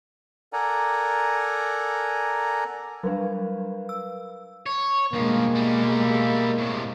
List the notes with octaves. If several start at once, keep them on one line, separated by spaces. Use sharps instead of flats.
A4 A#4 D5 F#5 G#5 A#5
F#3 G3 D4 A#4 B4 F5
E6
C#5
G2 B2 F3 G#3 A#3
G3 E4
A2 C3